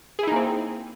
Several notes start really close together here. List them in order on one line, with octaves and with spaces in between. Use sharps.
G#4 E4 D#4 A#3 C4